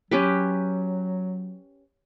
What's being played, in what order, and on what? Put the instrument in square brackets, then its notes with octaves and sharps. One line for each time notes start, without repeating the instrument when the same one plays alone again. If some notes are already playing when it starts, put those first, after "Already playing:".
[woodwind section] F#3 [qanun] C#4 G4 B4